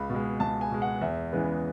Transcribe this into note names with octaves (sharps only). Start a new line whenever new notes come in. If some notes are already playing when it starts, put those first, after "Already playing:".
Already playing: C#2 B5
B2
G#3
C#2 A5
G#5
B2 G#3
F#5
E2 E5
C#3 E3 G#3 B3